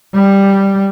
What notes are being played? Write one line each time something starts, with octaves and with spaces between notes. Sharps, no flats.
G3